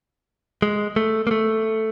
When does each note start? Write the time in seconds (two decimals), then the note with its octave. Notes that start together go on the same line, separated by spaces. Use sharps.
0.62 G#3
0.96 A3
1.27 A#3
1.31 A3